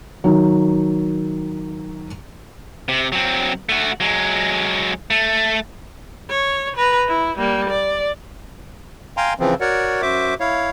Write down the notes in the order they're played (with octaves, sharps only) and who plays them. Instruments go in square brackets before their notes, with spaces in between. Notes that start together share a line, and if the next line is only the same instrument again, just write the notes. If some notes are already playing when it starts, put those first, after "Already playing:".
[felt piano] D#3 F#3
[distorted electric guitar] C3
F#3 C4
A3 F#4
F#3 G#3
A3
[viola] C#5
B4 A#5
E4
G3 A#3
D5
[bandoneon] F5 G5 G#5 A#5 C6
C#3 E3 F3 C4
F#4 A#4 C#5 D5 F#5
F#2 F#4 C5 E5 D6
E4 C#5 F5